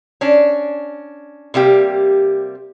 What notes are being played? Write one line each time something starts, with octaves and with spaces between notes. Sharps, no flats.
C#4 D4
C3 G3 A#3 G4